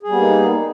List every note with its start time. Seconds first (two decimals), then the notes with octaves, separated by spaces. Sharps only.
0.03 G#4
0.07 G3
0.12 B3
0.16 A#3
0.21 D#4